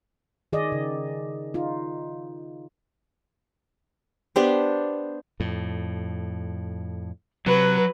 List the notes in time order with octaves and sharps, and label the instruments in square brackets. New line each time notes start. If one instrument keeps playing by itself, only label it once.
[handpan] D#3 G#4 D5 D#5
C#3
D#4 F4
[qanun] B3 D4 C5 [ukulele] G4
[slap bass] F2 A2
[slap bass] C3 [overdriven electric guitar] F#3 [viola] B4